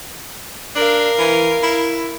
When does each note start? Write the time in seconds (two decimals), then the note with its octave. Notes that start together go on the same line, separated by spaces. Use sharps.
0.75 D4 A#4 F5
1.18 E3
1.63 E4